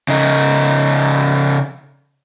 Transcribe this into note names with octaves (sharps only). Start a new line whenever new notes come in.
C#3 D#4